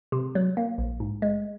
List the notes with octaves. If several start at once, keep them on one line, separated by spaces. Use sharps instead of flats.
C3
F#3
A#3
A#1
G#2
G#3